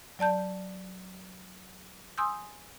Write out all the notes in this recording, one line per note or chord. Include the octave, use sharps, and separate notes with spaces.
F#3 D5 A5 G6
G#5 C6 D#6 E6 G6